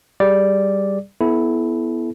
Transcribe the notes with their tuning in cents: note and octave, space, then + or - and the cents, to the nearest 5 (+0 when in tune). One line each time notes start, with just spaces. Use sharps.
G3 +0 G#4 -10 D5 +0
B3 +0 E4 +0 A4 -35